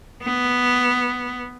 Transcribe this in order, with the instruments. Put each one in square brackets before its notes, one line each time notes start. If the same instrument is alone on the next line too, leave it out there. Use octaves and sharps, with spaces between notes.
[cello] B3